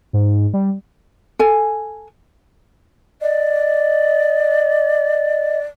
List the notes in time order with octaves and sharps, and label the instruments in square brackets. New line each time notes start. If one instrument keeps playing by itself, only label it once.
[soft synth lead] G#2
G3
[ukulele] A4 G#5
[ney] D5 [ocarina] D#5